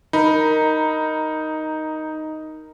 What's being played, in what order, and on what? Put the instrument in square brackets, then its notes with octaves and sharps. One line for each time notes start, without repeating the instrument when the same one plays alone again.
[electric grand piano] D#4 [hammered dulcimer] A#4 B5